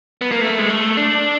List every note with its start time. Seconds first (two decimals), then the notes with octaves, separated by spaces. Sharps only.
0.21 B3
0.31 A#3
0.41 A3
0.58 G#3
0.70 A3
0.97 D4